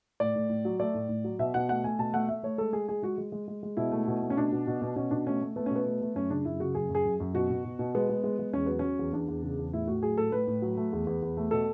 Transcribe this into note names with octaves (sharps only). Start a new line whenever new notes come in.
A2 D5
A2
A2
F#3
A3 D5
A2
A2
F#3
B2 E5
B2 F#5
A3 F#5
A3 G#5
B2 A5
A3 F#5
A3 E5
A3 C#5
G#3 A4
G#3 G#4
G#3 G#4
G#3 F#4
G#3
G#3
G#3
G#3
B2 E4
A3
B2
A3
C#4
B2 D4
B2
B2
B2
B2 C#4
B2 D4
A3 C#4
A3
A3 B3
B2 C#4
B3
A3
A3
F#2 C#4
C#3 D4
F#2 E4
C#3 F#4
F#2 G#4
F#2
G#4
F#2
F#2
B2 F#4
B2
B2
B2
G#3 B3
G#3
G#3
G#3
E2 C#4
F#3 B3
F#3 C#4
E2
E2 D4
E2
C#3
E2
A2 E4
A2 F#4
F#3 G#4
A2 A4
A2 B4
A2
F#3
A3
E2
E2
E2
A3
B2 A4